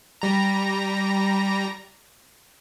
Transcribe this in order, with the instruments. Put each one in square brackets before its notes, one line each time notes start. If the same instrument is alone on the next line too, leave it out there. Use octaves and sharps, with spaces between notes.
[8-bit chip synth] G3 A#5